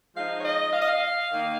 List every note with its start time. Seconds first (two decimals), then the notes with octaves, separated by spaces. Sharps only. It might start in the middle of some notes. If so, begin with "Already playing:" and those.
0.15 F3 G#3 D#4 F5
0.39 C#5
0.44 D#5
0.72 F5
0.81 D#5
0.89 F5
1.31 D#3 A#3 D#4